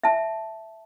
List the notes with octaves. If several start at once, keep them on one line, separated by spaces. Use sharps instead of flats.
E5 A5